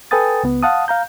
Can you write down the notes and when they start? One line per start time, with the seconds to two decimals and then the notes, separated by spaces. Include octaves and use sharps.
0.11 A4 B4 G5 G#5 D#6 A6
0.43 C#2 B3
0.63 F5 F#5 A5 D#6
0.88 F5 A#5 G6